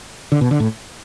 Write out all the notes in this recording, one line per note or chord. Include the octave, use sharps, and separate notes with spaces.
D3
B2
D3
A2